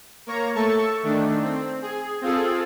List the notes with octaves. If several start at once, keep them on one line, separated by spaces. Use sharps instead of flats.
A#3 C#5 A#5
A3 A4 A5 C#6
D#3 A3 D4
C4
G#4
C4 F4 G#4 A4